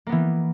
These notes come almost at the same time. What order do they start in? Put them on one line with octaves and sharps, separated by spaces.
A#3 B3 E3